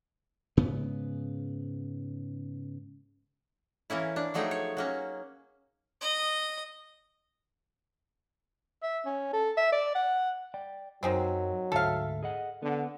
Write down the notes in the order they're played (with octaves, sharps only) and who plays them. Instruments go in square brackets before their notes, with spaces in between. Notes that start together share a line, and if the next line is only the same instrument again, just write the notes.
[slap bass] G#2 C#3 B3
[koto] E3 A#3 C#4 E4
D4
F3 F#3 A3 D#4 G#4 G5
C#5
F#3 A#3 C#4
[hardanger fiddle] D#5
[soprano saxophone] E5
C#4
A4
E5
D5
F#5
[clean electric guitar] D5 G5
[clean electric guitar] F#2 [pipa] D#3 G#3 C4 [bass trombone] F#3
[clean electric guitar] D2 G#2 E5 [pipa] A4 F5
[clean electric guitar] G#4 D#5 F#5
[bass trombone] D3 [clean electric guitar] B3 F#5